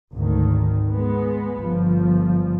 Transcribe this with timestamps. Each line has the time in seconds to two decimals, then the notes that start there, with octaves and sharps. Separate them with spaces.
0.14 G#1 D2 D#3
0.88 G#3 B3
1.58 G1 F3